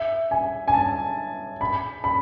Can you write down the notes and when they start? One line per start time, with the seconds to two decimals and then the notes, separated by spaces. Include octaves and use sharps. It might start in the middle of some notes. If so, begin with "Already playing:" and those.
Already playing: E5
0.31 G#5
0.68 G#5
0.74 A5
1.61 B5
2.04 B5